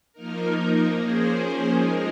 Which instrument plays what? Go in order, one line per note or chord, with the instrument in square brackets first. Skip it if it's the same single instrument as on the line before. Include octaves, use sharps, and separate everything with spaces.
[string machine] F3 A#3 D#4 A#4
F3 A#3 C#4 G#4 C5
F3 G#3 D#4 A#4